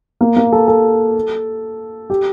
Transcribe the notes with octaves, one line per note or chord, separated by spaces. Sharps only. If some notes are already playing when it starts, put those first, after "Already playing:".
A#3
A#3
A4
A4
G4